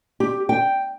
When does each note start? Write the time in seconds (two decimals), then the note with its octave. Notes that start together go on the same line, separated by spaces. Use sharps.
0.20 G4
0.49 G5